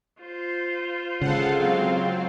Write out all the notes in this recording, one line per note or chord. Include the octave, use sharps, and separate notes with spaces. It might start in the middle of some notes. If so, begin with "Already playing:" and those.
F4 C5
C#3 G#3 A4 F5 F#5
F#3 C4